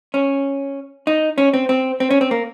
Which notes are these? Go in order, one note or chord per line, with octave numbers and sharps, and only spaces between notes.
C#4
D#4
C#4
C4
C4
C4
C#4
C4
A#3